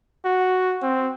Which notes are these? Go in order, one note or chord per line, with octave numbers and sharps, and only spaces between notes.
F#4
C4